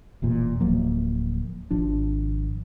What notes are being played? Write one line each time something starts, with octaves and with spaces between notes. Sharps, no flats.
E1 E2 A#2
D1 F3 F#3 A#3
G#1 F3 D4